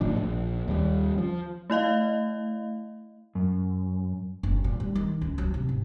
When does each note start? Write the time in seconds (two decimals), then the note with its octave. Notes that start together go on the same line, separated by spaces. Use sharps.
0.01 A1 A2 F3 D4
0.17 A#1
0.68 D#2 G3
1.18 F3
1.70 A3 E4 D#5 F5
3.35 F#2
4.43 F#1
4.64 A#2
4.80 G3
4.95 D#3
5.21 C#2
5.38 F#3
5.54 C3
5.69 G#2